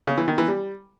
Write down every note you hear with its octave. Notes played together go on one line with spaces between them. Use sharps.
C#3
E3
D#3
E3
G3